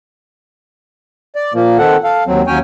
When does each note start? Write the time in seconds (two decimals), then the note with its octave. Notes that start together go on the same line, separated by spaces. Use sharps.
1.36 D5
1.54 A#2 F3 A#3
1.78 D#3 C4 A4 F#5
2.04 A4 F5
2.27 D#2 F#3 C4
2.47 D#2 F#3 C#4 C#5 G5 G#5